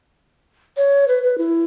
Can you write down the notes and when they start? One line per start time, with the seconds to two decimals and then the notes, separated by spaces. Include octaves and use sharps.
0.77 C#5
1.08 B4
1.24 B4
1.38 E4